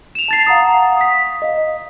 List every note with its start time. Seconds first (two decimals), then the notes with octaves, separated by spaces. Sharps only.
0.15 E7 F7
0.28 A5 A6 C7
0.47 F5 F#5 A#5 D#6
0.97 D#6 B6
1.42 D#5 F5